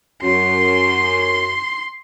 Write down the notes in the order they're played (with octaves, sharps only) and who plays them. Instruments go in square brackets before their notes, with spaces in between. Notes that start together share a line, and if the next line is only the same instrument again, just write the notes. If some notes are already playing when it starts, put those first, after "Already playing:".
[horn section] F#2 [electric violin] C6